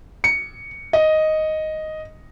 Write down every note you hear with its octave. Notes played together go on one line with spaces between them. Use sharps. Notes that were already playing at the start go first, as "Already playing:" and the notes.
C#7
D#5